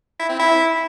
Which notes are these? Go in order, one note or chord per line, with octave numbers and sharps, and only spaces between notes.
E4
C4
E4